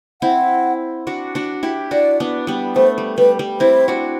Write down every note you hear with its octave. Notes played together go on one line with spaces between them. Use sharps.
C4 E4 F#5
D4 F#4
D4 F#4
E4 G4
D4 F#4 D5
B3 D4
G3 B3
A3 C5
G3
G3 B4
G3
C4 E4 C5
D4 F#4